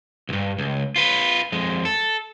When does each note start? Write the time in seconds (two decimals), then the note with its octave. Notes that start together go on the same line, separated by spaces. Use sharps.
0.29 B1 G2
0.58 C#2
0.96 F4 B4
1.52 F2 G#3
1.85 A4